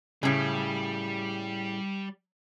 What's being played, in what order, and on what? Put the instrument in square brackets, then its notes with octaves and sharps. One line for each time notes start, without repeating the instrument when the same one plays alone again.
[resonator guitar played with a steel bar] A2 C#3 [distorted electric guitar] G3